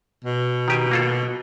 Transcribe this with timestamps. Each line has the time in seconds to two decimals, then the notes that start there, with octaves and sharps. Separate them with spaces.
0.24 B2
0.68 D#3 G4 G#5
0.91 A#3 F4 A4